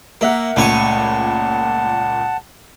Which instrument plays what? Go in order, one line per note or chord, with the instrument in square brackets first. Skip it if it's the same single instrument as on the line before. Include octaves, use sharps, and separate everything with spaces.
[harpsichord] A#3 [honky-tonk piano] A#4 E5 F#5
[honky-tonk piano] C#2 A#2 D#7 [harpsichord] A3 C#5 C#6 [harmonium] F#5 A5